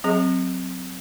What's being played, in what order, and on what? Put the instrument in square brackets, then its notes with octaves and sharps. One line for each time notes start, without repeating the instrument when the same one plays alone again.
[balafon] F#3 C4 G#4